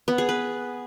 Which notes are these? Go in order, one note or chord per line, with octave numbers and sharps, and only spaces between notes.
B3
G#4
B4